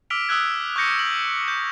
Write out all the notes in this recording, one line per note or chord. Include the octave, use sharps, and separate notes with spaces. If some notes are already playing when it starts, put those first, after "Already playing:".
D6 E6 F6 B6 D7 F7
D#6 E6 F#6 G#6
C#6 D6 F#6 G6 A#6 C#7
F#7
G6